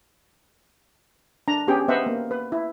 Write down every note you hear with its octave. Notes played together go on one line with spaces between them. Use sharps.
D4 A#5
B3 C#4 G4 G#4 G5
B3 C5 D#5 E5 F#5
A#3
B4
E4